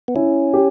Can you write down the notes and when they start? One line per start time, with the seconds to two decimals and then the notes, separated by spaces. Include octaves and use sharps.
0.08 B3
0.16 C#4 E4
0.54 G4